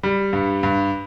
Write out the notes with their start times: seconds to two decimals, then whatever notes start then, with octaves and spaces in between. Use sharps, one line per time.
0.03 G3
0.33 G2
0.63 G2